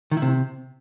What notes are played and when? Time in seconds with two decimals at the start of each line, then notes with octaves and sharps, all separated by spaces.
0.11 D#3
0.17 E4
0.22 C3